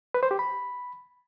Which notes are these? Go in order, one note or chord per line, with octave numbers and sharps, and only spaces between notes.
B4
C5
G4
B5